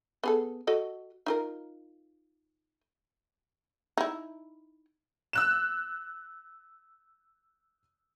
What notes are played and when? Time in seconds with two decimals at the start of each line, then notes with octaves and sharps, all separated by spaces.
0.23 B3 G#4 A4
0.67 F#4 A4 D#5
1.26 D#4 F4 A#4
3.98 D#4 E4
5.33 E6 F#6 E7